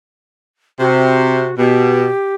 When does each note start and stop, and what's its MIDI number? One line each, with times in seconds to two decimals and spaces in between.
0.80 1.51 48
0.80 1.55 66
1.58 2.07 47
1.58 2.35 67